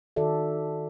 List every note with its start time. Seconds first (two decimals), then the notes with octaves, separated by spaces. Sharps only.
0.16 D#3 F#4 A4 D5 E5